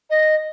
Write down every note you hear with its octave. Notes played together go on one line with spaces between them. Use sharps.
D#5